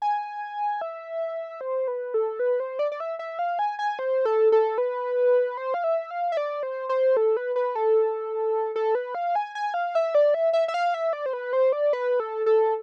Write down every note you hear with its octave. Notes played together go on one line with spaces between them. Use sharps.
G#5
E5
C5
B4
A4
B4
C5
D5
D5
E5
E5
F5
G#5
G#5
C5
A4
A4
B4
C5
F5
E5
F5
E5
D5
C5
C5
A4
B4
B4
A4
A4
B4
F5
G#5
G#5
F5
E5
D5
E5
E5
E5
F5
E5
D5
C5
B4
C5
D5
B4
A4
A4